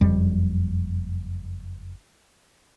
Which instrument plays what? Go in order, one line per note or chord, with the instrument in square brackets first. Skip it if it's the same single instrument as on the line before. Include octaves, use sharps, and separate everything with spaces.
[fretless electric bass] F#1 F2 G3